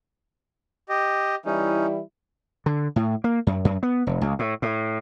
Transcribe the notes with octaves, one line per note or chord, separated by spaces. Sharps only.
G4 D#5
E3 G3 C#4 D#4 E4
D3
A2
A#3
F#2
F#2
B3
F1
C#2
A2
A2